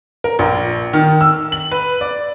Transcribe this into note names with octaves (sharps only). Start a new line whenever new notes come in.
A#4
A#1
D#3
E6
F#7
B4
D5